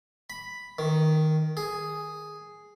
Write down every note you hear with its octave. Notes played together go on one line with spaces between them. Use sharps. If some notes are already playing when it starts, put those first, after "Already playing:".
B5
D#3
G#4